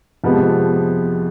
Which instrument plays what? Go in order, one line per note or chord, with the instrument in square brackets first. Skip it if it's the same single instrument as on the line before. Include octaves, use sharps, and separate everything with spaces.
[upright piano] F2 C3 F3 G#3 B3